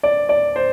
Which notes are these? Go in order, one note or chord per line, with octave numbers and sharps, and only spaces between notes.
D5
D5
C5